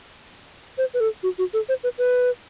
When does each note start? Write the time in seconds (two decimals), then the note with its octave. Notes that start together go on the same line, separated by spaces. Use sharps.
0.78 C5
0.94 B4
1.00 A4
1.23 F#4
1.38 F#4
1.54 A4
1.69 C5
1.84 B4
1.98 B4